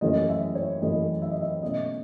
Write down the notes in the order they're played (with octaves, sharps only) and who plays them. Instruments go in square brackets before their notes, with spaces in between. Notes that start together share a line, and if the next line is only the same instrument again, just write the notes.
[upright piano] F#2 E3 A3 C#4 D#5
E5
C#5
F#2 E3 A3 C#4 D#5
E5
D#5
E5
B2 A3 C#4 D#5